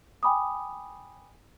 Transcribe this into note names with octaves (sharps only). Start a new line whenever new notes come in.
G5 G#5 B5 D6 D#6